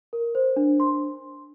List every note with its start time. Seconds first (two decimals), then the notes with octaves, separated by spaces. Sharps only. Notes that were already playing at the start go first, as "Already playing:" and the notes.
0.13 A#4
0.35 C5
0.56 D4
0.80 C6